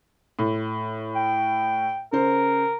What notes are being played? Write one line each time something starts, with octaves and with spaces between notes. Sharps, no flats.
A2
G5
C#3 A#4 C5